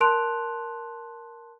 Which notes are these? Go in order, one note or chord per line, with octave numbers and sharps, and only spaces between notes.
A#4 A5 C6 F#6 D7 F7